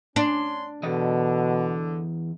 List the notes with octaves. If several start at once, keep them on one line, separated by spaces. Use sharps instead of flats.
C#4 D4 C6
E2 B2 D3 D#5